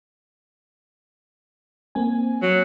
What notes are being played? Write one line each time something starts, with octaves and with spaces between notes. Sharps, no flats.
A#3 C4 G#5
F#3